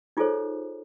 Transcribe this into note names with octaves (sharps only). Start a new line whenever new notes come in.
D#4 F4 G#4 A4 C5 C#5